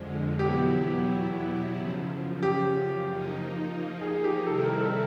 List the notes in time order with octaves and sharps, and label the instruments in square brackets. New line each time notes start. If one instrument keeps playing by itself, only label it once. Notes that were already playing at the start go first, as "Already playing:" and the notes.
Already playing: [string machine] F2 D3 F3 G#3
[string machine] E2 B2 F#3 B3 E4 [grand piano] G4
[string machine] F#2 C#3 F3
[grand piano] G4
[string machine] F3 A#3 D#4
[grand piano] G#4
G4
[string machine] C3 D#3 G3 C4 E4 [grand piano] A4
[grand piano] A#4
A4